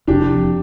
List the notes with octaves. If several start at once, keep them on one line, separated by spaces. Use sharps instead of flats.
F1 D4 G4
F2